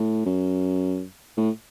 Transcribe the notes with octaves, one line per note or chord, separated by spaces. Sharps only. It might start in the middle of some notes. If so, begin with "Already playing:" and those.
Already playing: A2
F#2
A2